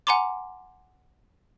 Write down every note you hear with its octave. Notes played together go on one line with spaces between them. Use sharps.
F#5 G#5 A#5 C6 D6